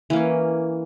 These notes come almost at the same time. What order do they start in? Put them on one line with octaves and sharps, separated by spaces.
E3 A#3 C#4